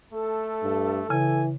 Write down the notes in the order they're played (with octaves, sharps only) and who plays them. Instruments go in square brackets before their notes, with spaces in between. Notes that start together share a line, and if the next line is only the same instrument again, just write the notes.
[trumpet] A3 [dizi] A4
[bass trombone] G2
[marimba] C#3 [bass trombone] E3 [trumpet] G#5